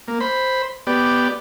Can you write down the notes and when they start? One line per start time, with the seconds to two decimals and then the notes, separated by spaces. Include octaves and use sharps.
0.08 A#3
0.21 C5 B5
0.87 B3 G4 D5